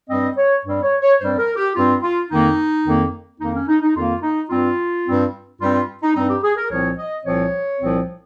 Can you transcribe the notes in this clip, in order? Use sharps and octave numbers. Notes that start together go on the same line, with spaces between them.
G2 G3 C4 D#5
C#5
G2 G3 C4
C#5
C#5
G2 G3 C4 C5
A#4
G4
G2 G3 C4 F4
F4
F2 D#3 A#3 D#4
F2 D#3 A#3
F2 D#3 A#3 D#4
C#4
D#4
D#4
F2 D#3 A#3 F4
D#4
G2 G3 C4 F4
G2 G3 C4
G2 G3 C4 F4
F4
D#4
G2 G3 C4 D#4
G4
G#4
A#4
C2 A#2 F3 C4 C#5
D#5
C2 A#2 F3 C4 C#5
C2 A#2 F3 C4